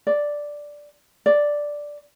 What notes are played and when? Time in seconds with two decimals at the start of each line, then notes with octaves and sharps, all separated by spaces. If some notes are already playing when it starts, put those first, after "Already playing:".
0.07 D5
1.26 D5